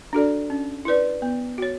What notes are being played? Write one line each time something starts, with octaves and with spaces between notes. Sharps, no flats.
D4 F#4 A4 D5
C#4
E4 B4 D5
B3
F#4 C#5